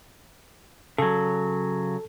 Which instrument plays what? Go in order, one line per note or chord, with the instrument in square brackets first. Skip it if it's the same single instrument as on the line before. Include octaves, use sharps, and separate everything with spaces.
[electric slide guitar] C#3 F#3 [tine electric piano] A4